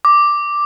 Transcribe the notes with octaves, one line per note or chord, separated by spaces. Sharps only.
D6